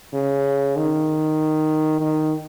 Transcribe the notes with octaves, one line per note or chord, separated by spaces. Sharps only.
C#3
D#3
D#3